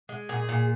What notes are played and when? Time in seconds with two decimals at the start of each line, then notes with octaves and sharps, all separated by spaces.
0.09 G#3
0.29 A#2 G#4
0.49 A#2